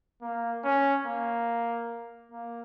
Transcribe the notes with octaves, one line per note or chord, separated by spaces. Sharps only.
A#3
C#4
A#3
A#3